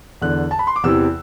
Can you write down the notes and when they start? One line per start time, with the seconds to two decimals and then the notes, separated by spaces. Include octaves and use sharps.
0.21 E2 D3 F#6
0.51 A5
0.59 B5
0.67 C6
0.76 D6
0.83 E2 C3 E3 E6